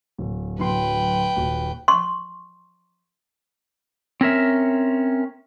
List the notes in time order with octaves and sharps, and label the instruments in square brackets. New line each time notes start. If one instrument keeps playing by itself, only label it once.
[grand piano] D1
[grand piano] D1 F#3 C6 [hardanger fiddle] B4 G5
[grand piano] D#1 F#4
[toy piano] C6 C#6
[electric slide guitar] C4 C#4 A#4 E5